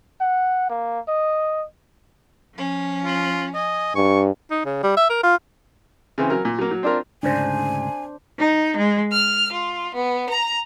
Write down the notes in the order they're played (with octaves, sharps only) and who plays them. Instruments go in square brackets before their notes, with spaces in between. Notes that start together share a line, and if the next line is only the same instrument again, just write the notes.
[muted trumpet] F#5
A#3
D#5
[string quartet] F3 C#4
[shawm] F4
[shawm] D#5 [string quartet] G#5
[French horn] G2 [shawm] C#6
[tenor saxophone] D#4
C#3
G3
E5
A#4
F4
[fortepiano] C#3 E3 C4
F#3 A#4
A#2
F#3 A#3
F#3
C4 D4 F4 A#4
[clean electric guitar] D2 G#2 C#3 [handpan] D4 C5 [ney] G#5
[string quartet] D#4
G#3
F6
F4
B3
A#5